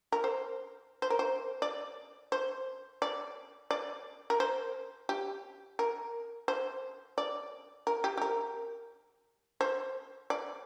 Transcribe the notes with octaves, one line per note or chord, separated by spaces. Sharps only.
A#4
C5
C5
A#4
C5
D5
C5
D5
D5
A#4
C5
G4
A#4
C5
D5
A#4
G4
G4
A#4
C5
D5